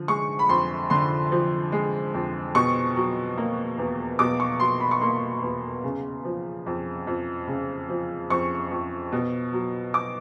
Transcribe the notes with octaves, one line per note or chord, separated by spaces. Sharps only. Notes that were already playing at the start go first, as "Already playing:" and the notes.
Already playing: D3 F3
G#3 C#6
B5
F2 C6
D3 C6
F3
G#3
F2
B2 C#6
F#3
A#3
E2
B2 D6
C#6
F#3 C6
B5
C#6
A#3 C6
E2
C#3
F3
F2
F2
C#3
F3
F2 C#6
F2
B2
F#3
D6